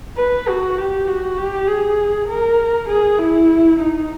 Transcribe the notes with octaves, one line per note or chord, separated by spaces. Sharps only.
B4
F#4
G4
F#4
G4
G#4
A#4
G#4
E4
D#4